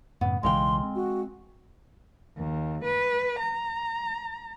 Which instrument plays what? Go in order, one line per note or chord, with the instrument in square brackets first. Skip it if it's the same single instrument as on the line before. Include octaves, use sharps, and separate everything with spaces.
[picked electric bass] F#2 A2 C#3 [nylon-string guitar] B3
[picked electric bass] B1 C#3 E3 [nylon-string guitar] G#3 F5 G5 [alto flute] C6
[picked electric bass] C4
[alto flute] F#4
[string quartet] D#2
B4
A#5